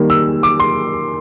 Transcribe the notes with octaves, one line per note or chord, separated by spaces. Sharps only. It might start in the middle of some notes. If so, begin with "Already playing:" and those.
Already playing: D#3 G3 A#3
E6
D6
C6